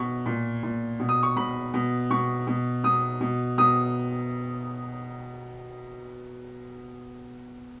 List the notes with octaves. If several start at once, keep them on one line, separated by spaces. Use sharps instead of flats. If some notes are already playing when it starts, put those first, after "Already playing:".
Already playing: B2 C#6
A#2
A#2
B2
D#6
C#6
B2 B5
B2
B2 C#6
B2
B2 D#6
B2
B2 D#6